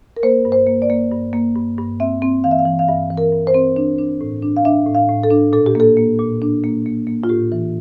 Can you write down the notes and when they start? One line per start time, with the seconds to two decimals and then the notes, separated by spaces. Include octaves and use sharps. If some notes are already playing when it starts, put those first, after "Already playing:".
0.17 A#4
0.23 A#3 C5
0.45 G2
0.52 C5
0.67 A#3
0.82 D5
0.90 A#3
1.12 G2
1.33 A#3
1.55 G2
1.78 G2
2.00 C4 E5
2.22 C4
2.44 E3 F5
2.51 E5
2.59 F5
2.66 E3
2.79 F5
2.88 G2 E5
3.10 E3
3.18 A#4
3.32 G2
3.47 C5
3.54 C4
3.76 D4
3.99 D4
4.21 A2
4.43 D4
4.56 F5
4.65 D4 E5
4.87 A2
4.95 F5
5.09 A2
5.24 A4
5.31 D4
5.53 A#2 A4
5.66 G4
5.75 A#3 A4
5.97 A#3
6.19 A#2
6.42 D4
6.64 A#3
6.86 A#3
7.07 A#3
7.24 F4
7.29 A2 G4
7.52 E3